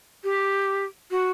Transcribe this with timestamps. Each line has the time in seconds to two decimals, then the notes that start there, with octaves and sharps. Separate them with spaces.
0.24 G4
1.11 F#4